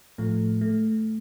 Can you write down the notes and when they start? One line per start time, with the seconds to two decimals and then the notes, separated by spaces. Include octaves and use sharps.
0.18 A2 F3 A3
0.61 A3